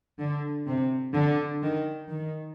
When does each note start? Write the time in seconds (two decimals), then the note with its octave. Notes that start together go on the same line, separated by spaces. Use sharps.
0.19 D3
0.67 C3
1.14 D3
1.62 D#3
2.09 D#3